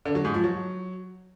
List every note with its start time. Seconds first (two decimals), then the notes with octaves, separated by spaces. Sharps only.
0.05 D3
0.15 F#3
0.25 G#2
0.34 F3
0.44 F#3